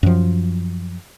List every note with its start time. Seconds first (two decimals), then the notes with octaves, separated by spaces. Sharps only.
0.03 F#2 F3